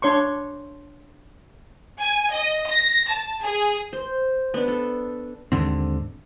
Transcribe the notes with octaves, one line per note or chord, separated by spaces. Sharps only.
D4 C#5 C6 C#6
G#5
D#5
A#6
A5
G#4
C5
B3 D4
A4
D#2 G#2 D3 C4